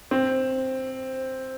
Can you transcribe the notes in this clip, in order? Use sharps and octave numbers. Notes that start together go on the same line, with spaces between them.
C4